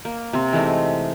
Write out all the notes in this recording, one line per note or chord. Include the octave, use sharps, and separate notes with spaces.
A#3
C3 C4
E3 G#3 A3 D#4